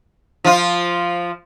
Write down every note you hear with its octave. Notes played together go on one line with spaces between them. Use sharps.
F3 F4